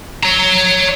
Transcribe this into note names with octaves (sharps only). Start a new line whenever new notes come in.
C#5 A#5